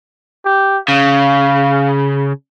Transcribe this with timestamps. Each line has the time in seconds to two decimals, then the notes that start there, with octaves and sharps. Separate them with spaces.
0.45 G4
0.88 C#3 F5